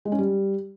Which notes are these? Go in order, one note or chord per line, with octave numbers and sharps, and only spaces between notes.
G#3
C#4
G3